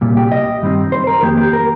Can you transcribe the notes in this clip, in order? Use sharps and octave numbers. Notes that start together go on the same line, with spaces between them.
C2 A#2 G3
G4
D#5
G2 D#3 G3 C4 D#4
C5
A#4
F2 D#3 A#3 G4
G4
A#4